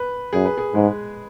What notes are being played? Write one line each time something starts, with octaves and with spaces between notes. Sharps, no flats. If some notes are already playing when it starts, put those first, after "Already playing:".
Already playing: B4
F#2 G#4
B4
G#4
G#2 G#3